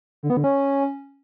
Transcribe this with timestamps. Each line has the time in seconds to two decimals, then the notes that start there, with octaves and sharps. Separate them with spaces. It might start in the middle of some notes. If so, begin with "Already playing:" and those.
0.23 D3
0.30 B3
0.37 D3
0.44 C#4